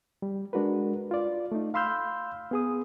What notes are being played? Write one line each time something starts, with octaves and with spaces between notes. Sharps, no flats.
G3
G#3 D4 F#4 A#4 B4
F4 D5
A3 D#4
F5 B5 C6 E6 F6 G6
B3 G#4 D#6